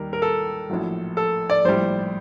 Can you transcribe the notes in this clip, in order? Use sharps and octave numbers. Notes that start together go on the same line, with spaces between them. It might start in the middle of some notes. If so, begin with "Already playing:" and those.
Already playing: D#2 D#3 G3 A#4
A#4
A4
A#1 A2 F#3
A4
D5
A#1 A2 G3 C5